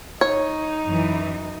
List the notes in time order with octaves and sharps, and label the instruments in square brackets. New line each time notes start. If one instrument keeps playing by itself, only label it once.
[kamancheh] D#4 [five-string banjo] C#5
[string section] F#2 E3